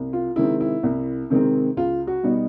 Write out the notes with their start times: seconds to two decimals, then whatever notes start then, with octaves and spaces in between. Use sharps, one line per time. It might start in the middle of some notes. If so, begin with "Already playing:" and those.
Already playing: C2
0.13 F4
0.36 C3 D#3 G#3 C4 E4
0.60 E4
0.83 C2
1.30 C3 D#3 G#3 C4
1.77 C#2 F4
2.07 F#4
2.23 B2 G3 B3 D#4